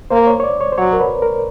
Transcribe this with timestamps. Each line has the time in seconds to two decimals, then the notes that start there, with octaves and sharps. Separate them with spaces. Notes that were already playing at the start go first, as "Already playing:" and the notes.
0.10 A#3 C5
0.27 C#5
0.40 C#5
0.43 D5
0.61 C#5
0.72 C5
0.78 F#3 C#5
0.93 A#4
1.00 B4
1.22 A#4